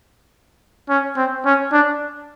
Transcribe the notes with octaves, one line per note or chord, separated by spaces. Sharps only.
C#4
C4
C#4
D4